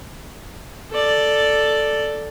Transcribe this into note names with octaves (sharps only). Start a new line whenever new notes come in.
A4 D5